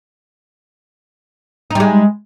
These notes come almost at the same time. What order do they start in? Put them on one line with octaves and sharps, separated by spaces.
D#4 G3 G#3